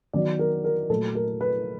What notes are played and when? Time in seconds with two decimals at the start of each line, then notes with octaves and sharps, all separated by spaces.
0.13 D#3 F#3 B3 D5
0.39 A#4
0.64 A#4
0.90 A#2 F#3 A3 A4
1.15 A#4
1.41 B4